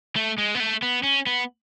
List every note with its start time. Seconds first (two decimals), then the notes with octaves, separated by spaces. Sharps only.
0.16 A3
0.38 G#3
0.55 B3
0.60 A3
0.82 B3
1.03 C#4
1.26 B3